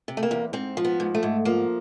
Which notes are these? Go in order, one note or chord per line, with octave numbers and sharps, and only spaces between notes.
C3
A3
A#3
E2
G#2 C4
F3
B3
G#2
A3
G#2
F3 A#3